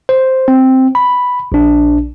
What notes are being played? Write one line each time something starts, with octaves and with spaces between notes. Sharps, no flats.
C5
C4
B5
A#1 D4